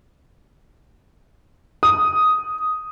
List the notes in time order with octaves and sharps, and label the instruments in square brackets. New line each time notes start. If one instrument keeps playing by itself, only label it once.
[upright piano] D#6